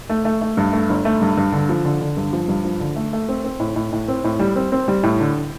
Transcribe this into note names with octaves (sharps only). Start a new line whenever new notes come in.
A3
A3
A3
G2
A3
G1
A3
G2
G2
D3
F3
D3
D3
G2
F3
G2
F3
D3
A3
A3
C4
C4
A2
A2
A2
C4
A2
G3
C4
C4
G3
A2
D3